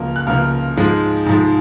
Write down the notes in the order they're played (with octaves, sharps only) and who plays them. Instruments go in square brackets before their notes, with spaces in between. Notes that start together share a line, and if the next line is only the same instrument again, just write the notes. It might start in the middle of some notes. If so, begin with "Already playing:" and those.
Already playing: [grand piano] C#2 C#3 F3 A#3 F6
F#6
C#2 C#3 F3 A#3 F6
G#2 F3 G#3
G#2 F3 G#3